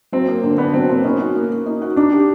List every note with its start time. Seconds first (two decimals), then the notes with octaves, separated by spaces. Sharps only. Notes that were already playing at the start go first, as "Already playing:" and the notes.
0.12 F#3 C4
0.28 A#3
0.43 D3
0.58 B3 D4
0.73 F#3 C4
0.89 A#3 C4
1.04 C#4 D#4
1.20 F#4
1.35 A#3
1.50 A#3
1.66 D#4
1.82 F#4
1.96 D4 D#4
2.12 G4